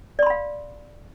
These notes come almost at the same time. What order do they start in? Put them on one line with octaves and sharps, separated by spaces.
D5 C6 B5 F5